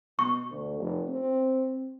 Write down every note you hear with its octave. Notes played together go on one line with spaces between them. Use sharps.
B2 C#6
D2
F1
C4